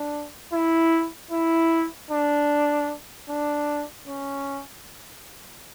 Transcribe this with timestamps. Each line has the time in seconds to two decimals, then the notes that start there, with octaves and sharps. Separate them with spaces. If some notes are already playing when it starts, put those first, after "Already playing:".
Already playing: D4
0.53 E4
1.31 E4
2.11 D4
3.29 D4
4.07 C#4